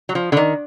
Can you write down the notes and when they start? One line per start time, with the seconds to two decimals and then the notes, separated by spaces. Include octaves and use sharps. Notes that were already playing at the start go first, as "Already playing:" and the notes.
0.09 F#3
0.15 F3
0.32 D3
0.37 D#3